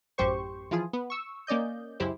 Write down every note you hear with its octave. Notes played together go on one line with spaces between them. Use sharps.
A1 F#2 G4 C5 C#6
E3 F3 F4 G#4
B3
C#6 E6
A#3 C#4 D5 D#5 G6
C#2 F#2 E4 G4 C5